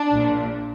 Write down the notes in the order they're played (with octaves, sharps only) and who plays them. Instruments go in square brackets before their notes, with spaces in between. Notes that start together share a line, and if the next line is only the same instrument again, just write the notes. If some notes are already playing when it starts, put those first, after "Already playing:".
Already playing: [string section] D4
A#1 A#2